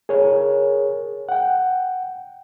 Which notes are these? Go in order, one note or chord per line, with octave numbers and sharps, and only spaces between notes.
G#4 A#4 C#5
F#5 G5